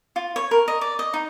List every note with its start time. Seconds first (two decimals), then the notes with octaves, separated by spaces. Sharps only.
0.16 F4
0.36 C#5
0.51 A#4
0.68 D#5
0.81 D5
0.99 D#5
1.14 D#4